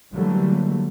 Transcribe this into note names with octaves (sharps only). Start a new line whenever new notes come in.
D3 E3 F#3 G3 A3 A#3